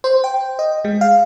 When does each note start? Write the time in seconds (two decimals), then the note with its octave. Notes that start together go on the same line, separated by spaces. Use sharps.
0.04 C5
0.24 G5
0.59 D#5
0.85 G#3
1.01 F5